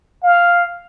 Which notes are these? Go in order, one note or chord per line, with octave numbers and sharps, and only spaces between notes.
F5